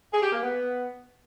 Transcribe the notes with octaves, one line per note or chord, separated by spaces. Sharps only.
G#4
G4
A#3
B3